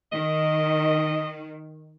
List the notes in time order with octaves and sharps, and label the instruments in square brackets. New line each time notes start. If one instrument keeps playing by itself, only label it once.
[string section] D#3 [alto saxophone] D#5